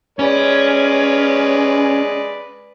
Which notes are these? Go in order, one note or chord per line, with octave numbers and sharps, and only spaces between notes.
G#3 C#4 B4 D5